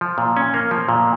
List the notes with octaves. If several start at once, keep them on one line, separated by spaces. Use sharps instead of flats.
F3
A#2
C#4
A#3
F3
A#2